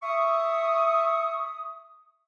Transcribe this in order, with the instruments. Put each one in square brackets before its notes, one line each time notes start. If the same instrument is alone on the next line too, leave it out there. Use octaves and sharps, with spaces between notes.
[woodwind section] E5 C#6 D#6